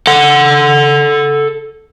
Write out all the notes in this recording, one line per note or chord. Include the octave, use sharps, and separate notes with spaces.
A4 F#5